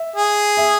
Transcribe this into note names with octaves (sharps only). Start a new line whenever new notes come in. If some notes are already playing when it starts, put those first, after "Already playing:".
Already playing: E5
G#4
E5